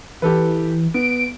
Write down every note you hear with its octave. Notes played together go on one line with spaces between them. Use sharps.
E3 G4 A4 B4
B3 D7